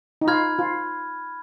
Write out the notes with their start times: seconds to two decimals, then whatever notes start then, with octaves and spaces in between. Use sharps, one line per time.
0.21 D#4
0.27 F4 B5 F6 G#6
0.59 F4